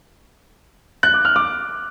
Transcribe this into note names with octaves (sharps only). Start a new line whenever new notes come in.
F#6
D6
F6
D6